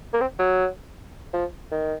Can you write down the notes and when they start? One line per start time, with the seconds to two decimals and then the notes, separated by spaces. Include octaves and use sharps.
0.13 A#3
0.20 C4
0.39 F#3
1.33 F3
1.71 D#3